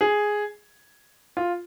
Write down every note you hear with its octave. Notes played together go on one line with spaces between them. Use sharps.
G#4
F4